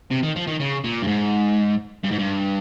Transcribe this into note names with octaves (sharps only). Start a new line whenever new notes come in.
C3
D#3
F3
D#3
C#3
A#2
G2
G#2
G2
G#2
G2